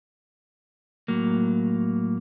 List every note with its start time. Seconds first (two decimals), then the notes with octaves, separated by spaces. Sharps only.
1.08 A2 F#3 A#3